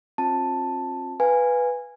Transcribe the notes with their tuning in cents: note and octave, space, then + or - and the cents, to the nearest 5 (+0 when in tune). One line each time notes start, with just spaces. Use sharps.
C4 +40 F4 +25 A5 +5
B4 +0 F5 +15 G#5 -15